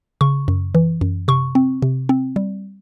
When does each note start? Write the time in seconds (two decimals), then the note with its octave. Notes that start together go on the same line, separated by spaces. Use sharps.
0.21 C#3 C#6
0.48 F#2
0.75 E3
1.01 F#2
1.28 C3 C#6
1.55 C4
1.82 C3
2.09 C4
2.36 G3